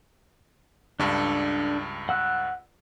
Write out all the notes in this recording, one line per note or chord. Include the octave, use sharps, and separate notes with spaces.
C#2 G2 D4 A4
F#5 E6 F#6